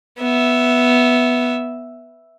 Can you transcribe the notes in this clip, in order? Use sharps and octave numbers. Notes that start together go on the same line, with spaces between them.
B3 E5